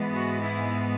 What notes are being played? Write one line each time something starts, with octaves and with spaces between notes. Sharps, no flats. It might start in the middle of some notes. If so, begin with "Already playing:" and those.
Already playing: G#2 E3 G#3 B3
F#4
E4